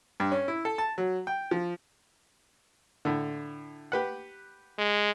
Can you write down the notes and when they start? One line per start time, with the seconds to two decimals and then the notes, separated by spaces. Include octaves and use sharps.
0.20 G2
0.32 C#4
0.48 E4
0.65 A4
0.78 A5
0.98 F#3
1.27 G5
1.51 F3
3.05 A2 D3
3.92 G4 B4 F#5
4.78 G#3